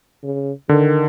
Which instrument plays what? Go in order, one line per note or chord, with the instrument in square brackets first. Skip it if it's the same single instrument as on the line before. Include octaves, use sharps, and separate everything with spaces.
[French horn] C#3
[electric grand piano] D3 [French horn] D#3